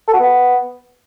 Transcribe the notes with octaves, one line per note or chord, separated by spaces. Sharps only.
A4
F#4
B3